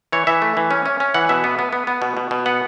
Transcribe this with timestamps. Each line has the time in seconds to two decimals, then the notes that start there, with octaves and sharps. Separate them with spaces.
0.12 E3 C#5
0.27 E3 E5
0.42 A3
0.57 E3
0.71 C#4
0.86 C#4
1.00 C#4
1.14 E3 F#5
1.29 B2 E5
1.44 B3
1.59 B3
1.73 B3
1.87 B3
2.02 B2
2.17 B2
2.31 B2
2.46 B3 F#5